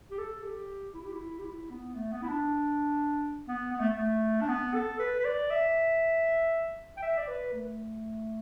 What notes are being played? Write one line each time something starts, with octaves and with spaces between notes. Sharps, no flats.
G4
A4
G4
E4
G4
E4
G4
E4
B3
A3
B3
E4
D4
B3
B3
A3
A3
D4
B3
A4
B4
B4
D5
E5
G5
E5
D5
B4
A3